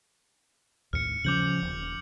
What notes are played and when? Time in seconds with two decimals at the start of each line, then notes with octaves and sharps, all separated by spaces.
0.93 D#2 A2 F6 C#7
1.24 C#3 F3 C#4 D6 G6 F#7
1.62 D#1